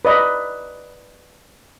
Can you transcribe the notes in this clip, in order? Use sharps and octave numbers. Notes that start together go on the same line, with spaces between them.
B4 D5 D#5 B5